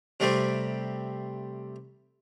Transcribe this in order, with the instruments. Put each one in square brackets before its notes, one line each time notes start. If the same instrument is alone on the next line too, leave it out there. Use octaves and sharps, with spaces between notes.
[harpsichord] C3 G3 A3 C4